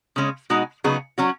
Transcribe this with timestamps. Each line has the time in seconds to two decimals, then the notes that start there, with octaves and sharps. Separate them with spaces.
0.16 C#3 G#3 C#4
0.50 B2 G#3 D#4 F#4
0.84 C#3 F#3 B3 D#4 G#4
1.18 F#3 C#4 F#4